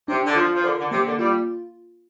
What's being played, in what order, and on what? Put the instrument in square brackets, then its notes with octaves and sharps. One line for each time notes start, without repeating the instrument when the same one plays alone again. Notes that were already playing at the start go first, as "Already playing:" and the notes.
[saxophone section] C3 [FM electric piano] D4
[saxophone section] D3
[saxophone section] F3 [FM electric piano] F4
[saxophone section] F3
[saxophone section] D3 [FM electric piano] A#4
[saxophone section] D3
[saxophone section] C3 [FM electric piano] A#3
[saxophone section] D3
[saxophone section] G3 [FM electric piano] F4